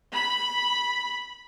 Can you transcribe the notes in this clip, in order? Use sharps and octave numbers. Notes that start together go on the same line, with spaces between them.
B5